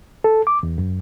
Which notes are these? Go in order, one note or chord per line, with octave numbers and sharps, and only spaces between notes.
A4
D6
E2
F#2